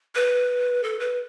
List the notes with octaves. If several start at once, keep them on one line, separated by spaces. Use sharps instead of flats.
B4
A4
B4